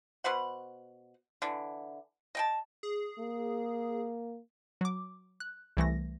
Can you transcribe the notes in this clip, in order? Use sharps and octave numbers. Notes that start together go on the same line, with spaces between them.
B2 B4 C5 F#5
D3 E3
D#5 G5 A5
G#4
A#3
F#3 D6
F#6
C2 E3 A3 A#6